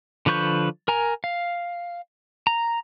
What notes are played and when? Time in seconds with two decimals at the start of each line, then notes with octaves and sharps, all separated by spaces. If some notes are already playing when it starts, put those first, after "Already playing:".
0.26 D3 F3 B4 C#6 G6
0.88 A#4 G#5 A#5
1.24 F5
2.47 A#5